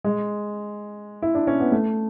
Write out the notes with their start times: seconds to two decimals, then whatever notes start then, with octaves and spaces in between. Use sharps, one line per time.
0.04 G#3
1.22 E4
1.35 D4
1.47 C#4
1.60 B3
1.72 A3